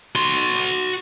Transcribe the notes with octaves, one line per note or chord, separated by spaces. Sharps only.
F#4 C6